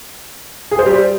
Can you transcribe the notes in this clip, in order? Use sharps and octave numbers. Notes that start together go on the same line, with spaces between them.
G#4
C5
G3